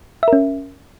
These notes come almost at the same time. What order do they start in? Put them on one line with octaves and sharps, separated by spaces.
E5 A#4 C#4